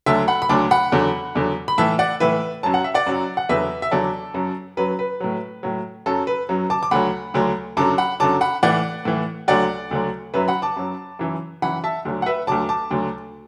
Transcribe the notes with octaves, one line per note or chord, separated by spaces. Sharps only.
D2 D3 F#3 E5 A5
F#5 B5
B5
D2 D3 F#3 A5 D6
F#5 B5
E2 D3 F#3
E2 D3 F#3
B5
A2 E3 E5 A5
D5 F#5
A2 E3 B4 E5
F#2 F#3 A5
F#5
E5
D5 F#5
F#2 F#3
F#5
E2 D3 F#3 B4 E5
E5
E2 D3 F#3 A4 D5
F#2 F#3
F#2 F#3 B4
B4
A2 F#3
A2 F#3
F#2 F#3 A4
B4
F#2 F#3
A5 D6
D6
D2 D3 F#3 F#5 B5
D2 D3 F#3
F#2 D3 F#3 A5 D6
F#5 B5
F#2 D3 F#3 A5 D6
F#5 B5
A2 E3 D5 F#5
A2 E3
D2 D3 F#3 D5 F#5
D2 D3 F#3
F#2 F#3 B4 E5
F#5 B5
A5 D6
F#2 F#3
F#2 E3
F#2 E3 F#5 B5
E5 A5
D2 D3 F#3
F#5
B4 E5
D2 D3 F#3 A5 D6
A5 D6
D2 D3 F#3